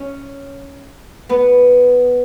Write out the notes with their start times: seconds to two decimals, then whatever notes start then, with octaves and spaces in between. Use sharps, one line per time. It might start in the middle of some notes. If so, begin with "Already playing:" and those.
Already playing: C#4 C#5
1.29 B3 B4